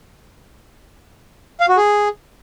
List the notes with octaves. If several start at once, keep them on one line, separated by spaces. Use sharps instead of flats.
F5
F#4
G#4